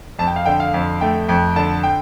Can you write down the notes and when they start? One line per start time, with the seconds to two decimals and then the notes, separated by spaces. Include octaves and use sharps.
0.19 F2 A5
0.27 G5
0.36 F5
0.45 D3 G5
0.60 F5
0.74 F2
1.01 A3 G5
1.28 F2 G5
1.56 D3 A5
1.83 G5